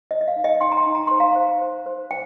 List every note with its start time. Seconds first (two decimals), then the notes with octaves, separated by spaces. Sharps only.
0.11 C5 D#5
0.21 D#5
0.28 F5
0.36 D#4
0.44 D#5 G5
0.61 D#4 G5 C6
0.72 A#5
0.77 G5 C6
0.87 D#4
0.95 A#5
1.07 C5 C6
1.20 F5 A#5
1.36 C5
1.61 C5
1.86 C5
2.11 G5